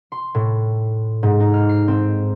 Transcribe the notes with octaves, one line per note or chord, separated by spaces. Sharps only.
C6
A2
G#2
D#4
F6
C7
C4